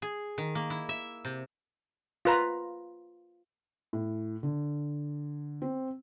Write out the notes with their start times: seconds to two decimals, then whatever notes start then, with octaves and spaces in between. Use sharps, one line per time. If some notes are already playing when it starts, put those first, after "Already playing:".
0.02 G#4
0.38 D#3
0.55 A#3
0.70 E4
0.89 E5
1.25 C3
2.25 F4 B4 A#5
3.93 A2
4.43 D3
5.62 C4